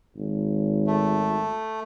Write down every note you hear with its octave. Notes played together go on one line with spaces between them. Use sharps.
G#1
A3